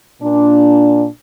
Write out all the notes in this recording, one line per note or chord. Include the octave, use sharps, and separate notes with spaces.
A#2 D4